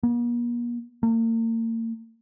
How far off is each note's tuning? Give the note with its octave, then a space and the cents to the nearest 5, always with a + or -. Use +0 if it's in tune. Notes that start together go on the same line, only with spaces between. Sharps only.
A#3 +45
A#3 -40